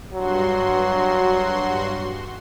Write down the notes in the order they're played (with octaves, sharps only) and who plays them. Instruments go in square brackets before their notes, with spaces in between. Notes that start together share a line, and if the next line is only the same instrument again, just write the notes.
[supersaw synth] G2 F#4 C6 [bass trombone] F#3